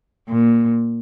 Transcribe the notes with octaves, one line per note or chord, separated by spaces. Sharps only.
A#2